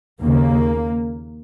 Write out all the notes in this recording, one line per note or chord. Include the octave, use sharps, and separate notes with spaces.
D#2 C#3 A#3